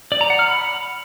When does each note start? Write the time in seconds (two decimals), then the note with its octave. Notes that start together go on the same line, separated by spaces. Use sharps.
0.12 D5
0.21 A#5
0.30 F#5
0.39 F6
0.48 B5